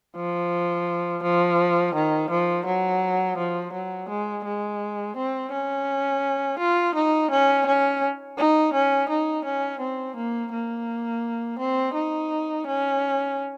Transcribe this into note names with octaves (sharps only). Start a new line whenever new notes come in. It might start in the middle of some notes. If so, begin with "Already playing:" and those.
F3
F3
D#3
F3
F#3
F3
F#3
G#3
G#3
C4
C#4
F4
D#4
C#4
C#4
D#4
C#4
D#4
C#4
C4
A#3
A#3
C4
D#4
C#4